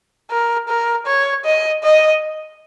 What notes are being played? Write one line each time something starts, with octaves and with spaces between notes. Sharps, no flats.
A#4
A#4
C#5
D#5
D#5